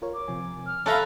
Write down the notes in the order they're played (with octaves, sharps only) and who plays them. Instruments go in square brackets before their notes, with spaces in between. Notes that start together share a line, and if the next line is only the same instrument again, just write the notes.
[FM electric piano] F4 A#4 C#5
[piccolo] D6
[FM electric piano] C3 F3 G#5
[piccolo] F6
[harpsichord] C#4 E5 F5 [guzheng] A4 B4 A#5